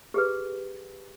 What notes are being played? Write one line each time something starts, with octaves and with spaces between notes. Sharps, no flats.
G4 G#4 B4